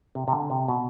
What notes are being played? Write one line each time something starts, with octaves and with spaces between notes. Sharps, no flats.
C3
C3
D3
C3
B2